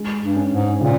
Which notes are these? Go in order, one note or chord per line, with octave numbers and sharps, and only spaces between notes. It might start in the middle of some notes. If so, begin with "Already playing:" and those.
Already playing: G#3
G2
C#4
G#2
A#2 C#3